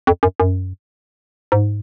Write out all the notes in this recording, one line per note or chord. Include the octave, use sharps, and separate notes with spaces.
F2
F#2
F#2
G#2